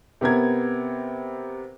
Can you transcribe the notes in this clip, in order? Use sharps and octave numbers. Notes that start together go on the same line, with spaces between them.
C3 B3 A#4 G#6